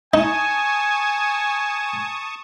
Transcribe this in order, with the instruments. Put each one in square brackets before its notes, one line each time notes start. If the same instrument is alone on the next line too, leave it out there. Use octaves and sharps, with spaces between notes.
[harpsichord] D#4 [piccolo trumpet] G#5 [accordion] A5 C#6 D#6